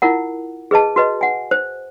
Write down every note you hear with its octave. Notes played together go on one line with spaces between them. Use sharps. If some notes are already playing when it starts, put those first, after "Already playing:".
E4 F4 A#4 F#5
G#4 B4 D#5 A5
F#4 B4 D#5
F#5 G#5
C5